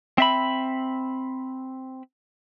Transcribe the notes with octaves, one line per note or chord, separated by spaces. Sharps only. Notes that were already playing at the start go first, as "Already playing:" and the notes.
C4 E5 B5